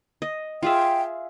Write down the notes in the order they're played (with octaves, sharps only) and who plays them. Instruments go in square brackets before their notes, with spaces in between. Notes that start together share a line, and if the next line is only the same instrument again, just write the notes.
[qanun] D#5
[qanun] F4 G#4 E5 [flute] G5